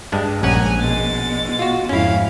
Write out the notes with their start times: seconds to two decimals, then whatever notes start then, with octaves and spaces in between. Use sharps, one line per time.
0.12 G2 G#3 D4
0.43 A#1 G#3 C#4 F#5 G#5 A#5
0.80 B2 G#3 A6
1.59 F4 F#4
1.89 F2 G#2 C#4 E4 F5